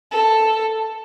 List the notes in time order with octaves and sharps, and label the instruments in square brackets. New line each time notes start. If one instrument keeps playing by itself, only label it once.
[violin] A4